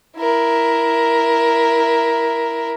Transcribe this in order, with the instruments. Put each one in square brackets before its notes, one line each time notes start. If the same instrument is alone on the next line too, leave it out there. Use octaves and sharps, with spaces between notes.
[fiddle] E4 A#4